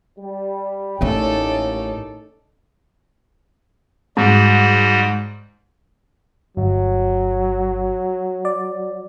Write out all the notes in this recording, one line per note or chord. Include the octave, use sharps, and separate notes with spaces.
G3
A1 D#2 A2 A3 C#4 D#4 A4 D5
G#2 G3 F#4
G1 F#3
D5